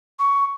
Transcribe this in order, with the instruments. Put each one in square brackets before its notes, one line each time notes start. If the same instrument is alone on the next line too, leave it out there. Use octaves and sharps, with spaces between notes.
[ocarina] C#6